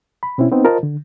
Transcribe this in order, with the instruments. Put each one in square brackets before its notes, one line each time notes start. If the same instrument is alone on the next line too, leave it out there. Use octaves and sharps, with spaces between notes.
[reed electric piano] B5
B2 C4 C#4 E4
B3 C4 D#4
F4 A#4 C5 D#5 A5
D3